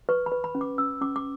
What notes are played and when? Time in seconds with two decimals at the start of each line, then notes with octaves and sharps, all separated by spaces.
0.09 B4 C#6
0.26 B5
0.32 B4
0.44 B5
0.55 C#4
0.61 D6
0.78 C#4 E6
1.01 C#4 D6
1.16 D6